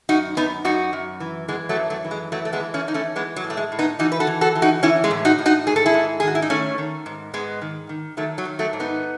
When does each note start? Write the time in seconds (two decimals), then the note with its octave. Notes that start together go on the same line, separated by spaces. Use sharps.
0.09 F#2 D#4 F#4
0.37 F#2 B3 D#4
0.64 F#2 D#4 F#4
0.93 F#2
1.20 E3
1.48 E3 G#3 B3
1.69 F#3 A3
1.77 F#2
1.90 F#3 A3
2.04 E3
2.11 G#3
2.32 E3 F#3 A3
2.45 A3
2.53 G#3 B3
2.60 E3
2.74 A3 C#4
2.88 E3 D#4
2.94 A3 C#4
3.15 E3 G#3 B3
3.36 F#3
3.44 A2
3.50 A3
3.57 G#3
3.72 A2
3.79 B3 D#4
3.99 E3 D#4 F#4
4.12 B4
4.20 F#4 A4
4.27 E3
4.41 F#4 A4
4.55 E3
4.62 D#4 F#4
4.83 E3 C#4 E4
5.04 G#3
5.11 A2
5.25 D#4 F#4
5.39 A2
5.46 D#4 F#4
5.67 G#2 G#4
5.76 A4
5.86 E4 G#4
5.94 G#2
6.20 D#3 G#4
6.27 F#4
6.35 E4
6.42 D#4
6.50 D#3 A3 C#4
6.78 D#3
7.06 G#2
7.34 G#2 G#3 B3
7.61 D#3
7.89 D#3
8.17 D#3 F#3 A3
8.38 F#3
8.45 D#3
8.59 F#3 A3
8.73 G#2
8.80 B3 D#4